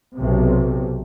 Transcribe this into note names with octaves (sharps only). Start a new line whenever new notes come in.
B1 C3